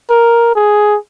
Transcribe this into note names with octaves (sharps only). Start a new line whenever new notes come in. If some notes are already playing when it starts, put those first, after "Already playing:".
A#4
G#4